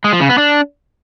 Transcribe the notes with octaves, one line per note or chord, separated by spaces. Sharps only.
G#3
F3
C#3
B3
D4